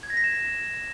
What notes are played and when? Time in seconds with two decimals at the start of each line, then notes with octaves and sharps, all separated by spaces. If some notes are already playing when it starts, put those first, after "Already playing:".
0.03 G#6
0.10 A#6
0.17 B6
0.24 E7